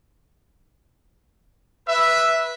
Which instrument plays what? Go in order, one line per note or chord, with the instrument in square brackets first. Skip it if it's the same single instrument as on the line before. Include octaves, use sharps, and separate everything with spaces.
[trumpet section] B4 E5